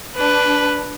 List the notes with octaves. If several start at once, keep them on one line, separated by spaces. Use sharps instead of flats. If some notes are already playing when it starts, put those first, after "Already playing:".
D4 B4